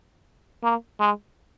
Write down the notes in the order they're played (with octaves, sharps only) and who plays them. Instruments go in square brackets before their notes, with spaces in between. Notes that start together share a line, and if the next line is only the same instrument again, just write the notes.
[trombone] A#3
G#3